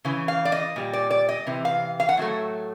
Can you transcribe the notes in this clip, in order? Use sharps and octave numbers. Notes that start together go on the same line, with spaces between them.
C#3 E3
F5
D5
D#5
A#2 G3
D5
D5
D#5
C3 E3
F5
F5
F#5
A2 F#3 A3